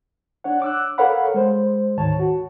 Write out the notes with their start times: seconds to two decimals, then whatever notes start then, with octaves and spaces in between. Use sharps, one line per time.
0.44 D4 C#5 F#5
0.62 D6 E6 F#6
0.98 A4 A#4 C#5 F5 F#5 B5
1.34 G#3 C5
1.98 D2 G#2 D#3 C#5 A5
2.19 F#4